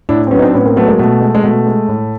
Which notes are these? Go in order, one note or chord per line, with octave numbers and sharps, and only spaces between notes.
A2 D4 E4
C4
F#3 B3 C#4
D#4
C4 D4
A2 B3 C#4
A#3 C4
F#3 A3 B3
G#3 A#3
B2 A3
G#3
G#3
B2 A3
G#3
A2